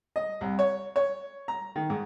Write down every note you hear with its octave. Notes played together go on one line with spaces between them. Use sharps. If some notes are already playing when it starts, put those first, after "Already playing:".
D#5
C2
C#5
C#5
A#5
D#3
G#2